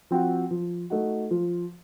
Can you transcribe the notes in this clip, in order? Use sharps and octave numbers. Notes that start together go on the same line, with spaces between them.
F3 C4 F#4
F3
A3 D#4 F#4
F3